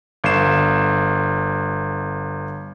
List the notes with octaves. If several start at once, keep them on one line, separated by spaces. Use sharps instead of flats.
G1 F5 C7 E7